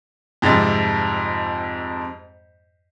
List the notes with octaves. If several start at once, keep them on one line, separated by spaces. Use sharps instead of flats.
F2 G#2 C3 G3 A6